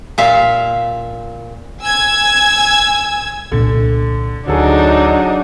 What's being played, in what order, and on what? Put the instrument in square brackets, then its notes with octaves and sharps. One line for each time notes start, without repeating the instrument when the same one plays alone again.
[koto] A#2 E5 F5
[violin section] G#5 E6 G#6
[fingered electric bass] C2 A#2 B3 [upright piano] D3
[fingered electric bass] D2 [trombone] F#3 [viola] D4 D#4 [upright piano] G#4 A4